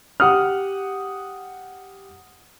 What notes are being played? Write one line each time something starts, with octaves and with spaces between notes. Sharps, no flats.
G4 F#5 D#6 F6